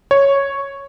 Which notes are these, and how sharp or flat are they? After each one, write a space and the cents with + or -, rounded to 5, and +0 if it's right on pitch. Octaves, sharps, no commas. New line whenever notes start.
C#5 +0